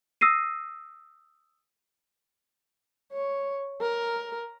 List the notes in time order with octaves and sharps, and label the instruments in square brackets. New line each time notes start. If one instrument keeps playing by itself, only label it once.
[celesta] D#6 E6 A#6 C7 D#7
[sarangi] C#5
A#4